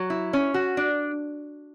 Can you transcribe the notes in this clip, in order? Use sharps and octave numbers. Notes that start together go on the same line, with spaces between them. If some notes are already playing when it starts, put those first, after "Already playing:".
Already playing: F#3
E4
C#4
F#4
D4